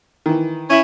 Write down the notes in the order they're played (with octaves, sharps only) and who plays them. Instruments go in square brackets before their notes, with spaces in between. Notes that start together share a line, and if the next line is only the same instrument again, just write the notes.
[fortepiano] D#3 E3
[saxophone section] C#4 E4